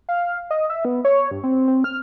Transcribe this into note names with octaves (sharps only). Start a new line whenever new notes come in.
F5
D#5
E5
B3
C#5
G2
C4
C4
F6